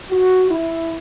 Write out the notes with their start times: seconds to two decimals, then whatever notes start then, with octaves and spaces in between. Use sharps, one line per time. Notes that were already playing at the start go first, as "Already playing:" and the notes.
0.10 F#4
0.50 E4